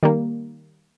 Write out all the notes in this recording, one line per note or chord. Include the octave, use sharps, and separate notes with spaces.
D#3 G3 A#3